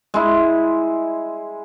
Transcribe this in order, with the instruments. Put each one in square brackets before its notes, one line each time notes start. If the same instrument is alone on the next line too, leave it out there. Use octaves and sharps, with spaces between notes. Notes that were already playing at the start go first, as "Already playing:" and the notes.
[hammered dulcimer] G#3 E4